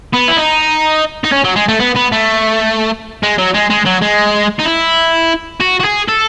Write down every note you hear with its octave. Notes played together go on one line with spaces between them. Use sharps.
B3
E4
D#4
D#4
C#4
F#3
G#3
A3
B3
B3
A3
G#3
F#3
G#3
G#3
F#3
G#3
D#4
E4
F#4
F#4
G#4
A4